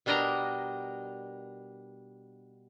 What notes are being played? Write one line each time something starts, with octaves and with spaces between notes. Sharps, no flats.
B2 G3 D4 A#4 D#5 A#5